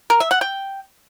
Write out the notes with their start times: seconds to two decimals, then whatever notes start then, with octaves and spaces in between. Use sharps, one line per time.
0.10 A#4
0.20 E5
0.31 F#5
0.41 G5